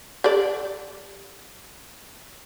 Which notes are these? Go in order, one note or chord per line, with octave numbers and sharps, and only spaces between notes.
G4 A4 D5